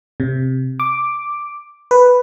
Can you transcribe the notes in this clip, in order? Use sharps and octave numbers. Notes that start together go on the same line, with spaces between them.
C3
D6
B4